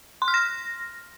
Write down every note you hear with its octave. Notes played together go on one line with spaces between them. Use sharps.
C6
F6
A#6